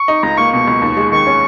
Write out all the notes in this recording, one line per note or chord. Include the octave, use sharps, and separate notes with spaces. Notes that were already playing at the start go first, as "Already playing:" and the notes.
Already playing: C#6
D#4
C#2 A#5
A#3 C#6
B2 C#6
C#2
D#2
G#3
D#3 C#6
C#4